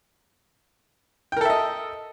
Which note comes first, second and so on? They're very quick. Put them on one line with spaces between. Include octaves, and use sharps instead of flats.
G5 A#4 A4 E5 D#5